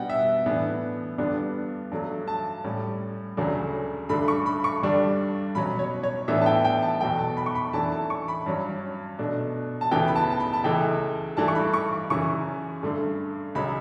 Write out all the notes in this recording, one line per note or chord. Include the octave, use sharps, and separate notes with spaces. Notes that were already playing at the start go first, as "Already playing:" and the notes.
Already playing: B2 G3 B3 D4 F#5 G5
E5
A2 E3 B3 D4
G2 D3 G3 B3 D4
G2 F#3 A3
A5
A2 G3 C#4
D2 C#3 F#3 A3 D4
G2 D3 A3 B5
C#6
B5
C#6
G2 D3 G3 D4
B2 F#3 C#4 B5
C#5
C#5
A2 E3 B3 D4 E5
A5
G5
G5
A5
E2 B2 F#3 A3 G5
A5
B5
C#6
B5
F#2 E3 A3 D4 A5
A5
C#6
B5
G2 F#3 C#4
B2 A3 D4
A5
D2 C#3 E3 B3 G5
B5
A5
A5
B5
A5
C#2 C#3 E3 A3 G5
G2 E3 A3 A5
C#6
B5
C#6
F#2 C#3 E3 C#6
G2 D3 A3
C#2 C#3 F#3 C#4 B5